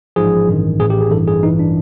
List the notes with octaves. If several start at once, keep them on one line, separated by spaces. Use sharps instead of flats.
A1 G#2 F3 G#4
A1 G2 D#3
A1 A2 E3 G#4
G4
G#4
A1 G2 E3 A4
G#4
A1 G2 E3 D#4
D4